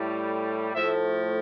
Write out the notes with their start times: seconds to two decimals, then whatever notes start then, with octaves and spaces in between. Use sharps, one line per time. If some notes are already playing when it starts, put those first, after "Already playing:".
Already playing: A2 G3
0.74 A2 F3 A3 E5